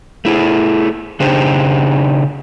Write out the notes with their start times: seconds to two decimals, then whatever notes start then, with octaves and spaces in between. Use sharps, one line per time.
0.25 A3 E4 G#4
1.20 C#3 D4 D#4 G4 G#4 C5